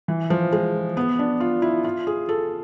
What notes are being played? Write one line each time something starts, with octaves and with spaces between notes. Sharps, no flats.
E3
F3
G#3
B3
D4
F4
E4
F4
G#4
A4